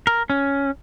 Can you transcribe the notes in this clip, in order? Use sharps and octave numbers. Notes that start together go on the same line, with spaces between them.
A#4
C#4